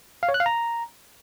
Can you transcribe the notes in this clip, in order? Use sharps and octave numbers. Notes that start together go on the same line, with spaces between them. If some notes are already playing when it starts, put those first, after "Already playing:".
F5
C#5
F#6
F5
A#5